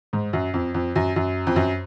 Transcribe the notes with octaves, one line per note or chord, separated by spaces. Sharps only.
G#2
F#2
F2
F2
F#2
F#2
F2
F#2